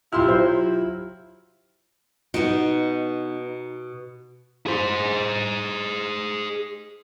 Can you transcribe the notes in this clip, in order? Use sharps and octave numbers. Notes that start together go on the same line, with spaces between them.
B1 E4 F4 G4 C6 F6
F#3 E4 C5
B2 B3 D#4
G#4 C5